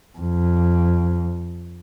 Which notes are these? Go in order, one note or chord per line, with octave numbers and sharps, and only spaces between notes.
F2